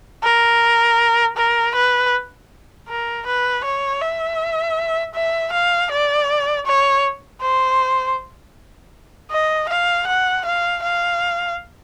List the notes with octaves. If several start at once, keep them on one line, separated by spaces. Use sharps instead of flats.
A#4
A#4
B4
A#4
B4
C#5
E5
E5
F5
D5
C#5
C5
D#5
F5
F#5
F5
F5